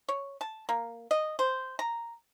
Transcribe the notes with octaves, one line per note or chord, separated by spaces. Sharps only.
C#5
A5
A#3
D#5
C5
A#5